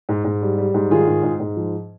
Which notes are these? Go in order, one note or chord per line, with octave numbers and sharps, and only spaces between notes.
G#2
G#2
G3
G3
G#2
D#3 F4 G#4
G#2
G#2
G#2
F3